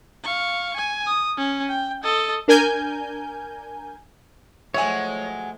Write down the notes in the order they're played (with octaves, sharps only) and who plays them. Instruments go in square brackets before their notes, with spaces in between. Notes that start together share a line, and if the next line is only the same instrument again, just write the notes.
[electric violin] F5 C#6
G#5
D#6
C#4
G5
A4 D#5
[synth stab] D4 A#4 G#5 G6
[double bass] F3 A3 [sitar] F#3 G#3 [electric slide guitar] C#5 [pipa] E5 G#5